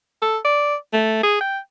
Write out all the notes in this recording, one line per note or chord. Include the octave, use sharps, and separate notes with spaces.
A4
D5
A3
G#4
G5